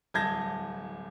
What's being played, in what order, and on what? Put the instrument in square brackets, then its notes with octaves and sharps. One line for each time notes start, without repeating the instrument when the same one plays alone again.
[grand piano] D1 C2 A5 G6 G#6 A#6